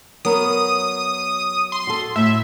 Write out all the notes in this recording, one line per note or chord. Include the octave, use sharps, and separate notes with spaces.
F#3 B3 A#4 D#6
C6
F#4 A4
A2 E5